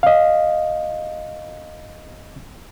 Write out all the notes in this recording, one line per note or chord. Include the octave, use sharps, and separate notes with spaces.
D#5 F5